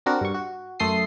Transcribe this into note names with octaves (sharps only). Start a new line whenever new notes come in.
C4 D4 F#4 A#4
G2 C#6
F#4
F#2 A3 A4 C6 D#6 C7